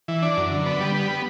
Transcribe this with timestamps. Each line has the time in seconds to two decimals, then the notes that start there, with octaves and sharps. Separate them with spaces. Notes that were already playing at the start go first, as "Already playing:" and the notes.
0.08 E3
0.22 D4
0.37 F#2
0.51 D3
0.66 B3
0.80 G3
0.95 B3